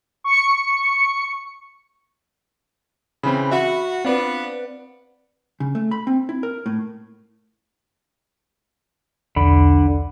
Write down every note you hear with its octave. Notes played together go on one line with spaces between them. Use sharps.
C#6 C#7
C#3 E3 C4 B5
F#4 E5
B3 C4 D4 F4 B4 D5 F#5
C#3
A3
B5
C4
E4
A#4
A2
B1 E2 D3 B5